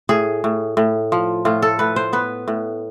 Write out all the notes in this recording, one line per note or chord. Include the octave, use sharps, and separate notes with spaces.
A2 G#4
A2
A2
F3
A2 F4
A4
A2 B4
C5
B3 B4
A2